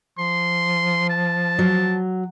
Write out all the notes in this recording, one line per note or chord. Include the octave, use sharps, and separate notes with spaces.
F3 C6
A5
F#3